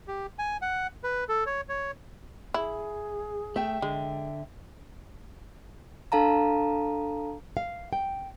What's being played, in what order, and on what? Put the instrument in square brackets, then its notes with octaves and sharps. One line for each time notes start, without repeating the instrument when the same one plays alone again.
[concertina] G4
G#5
F#5
B4
A4
C#5
C#5
[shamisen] E4 [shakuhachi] G#4
[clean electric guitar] A3 [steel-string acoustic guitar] E5 G5
[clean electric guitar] D3 [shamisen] G#3
[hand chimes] D4 A4 F5 A5 A#5
[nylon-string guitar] F5
G5